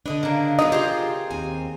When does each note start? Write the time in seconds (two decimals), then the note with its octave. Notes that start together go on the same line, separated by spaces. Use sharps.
0.06 D3 D4 B4 D#5
0.23 C#3 A#3
0.59 F#3 B3 D#4 B4 D#5
0.72 F4 G4 G#4 C5 A#5
1.31 D#2 C4 G#5